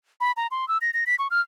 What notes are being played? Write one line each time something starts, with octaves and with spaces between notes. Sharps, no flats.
B5
A#5
C6
E6
A#6
A#6
B6
C#6
F6